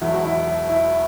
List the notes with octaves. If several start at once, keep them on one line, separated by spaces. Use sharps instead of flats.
E1 E2 B2 F#3 E4
F#4
E4
E4